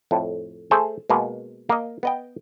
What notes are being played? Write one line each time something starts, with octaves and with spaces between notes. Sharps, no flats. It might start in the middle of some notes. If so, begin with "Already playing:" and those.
F2 A2
A3 G#4 C5
B2 G#3 A#3
A#3 D#5
B3 D#5 G5